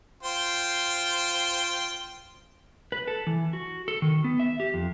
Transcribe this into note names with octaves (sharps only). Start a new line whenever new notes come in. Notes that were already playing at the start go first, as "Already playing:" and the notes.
F4 C5 G5
B4
A4
E3
F#4
A4
D#3
B3
E5
G4
F2